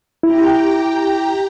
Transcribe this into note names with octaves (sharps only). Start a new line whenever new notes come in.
E4 G4 G5 A#5